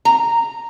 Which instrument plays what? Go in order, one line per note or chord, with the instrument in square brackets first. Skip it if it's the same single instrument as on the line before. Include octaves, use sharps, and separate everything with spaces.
[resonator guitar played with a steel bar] A#5